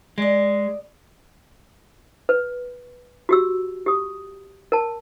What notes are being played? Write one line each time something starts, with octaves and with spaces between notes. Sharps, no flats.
G#3 D5 D#5
B4
F#4 G4 E6
G4 D#6
A#4 A5